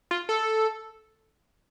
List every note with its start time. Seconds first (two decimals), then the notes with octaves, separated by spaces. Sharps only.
0.11 F4
0.29 A4